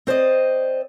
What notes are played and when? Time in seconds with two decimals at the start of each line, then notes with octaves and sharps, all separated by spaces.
0.07 C4 C5 D5 D#5